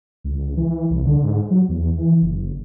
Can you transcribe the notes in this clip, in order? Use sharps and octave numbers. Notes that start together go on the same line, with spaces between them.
C#2
E3
C2
D3
G#2
F#3
E2
E3
F#1